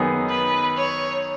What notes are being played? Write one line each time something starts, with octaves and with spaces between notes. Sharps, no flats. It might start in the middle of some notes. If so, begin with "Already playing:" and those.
Already playing: F#2 D#3 B3 D#4 G#4
B4
C#5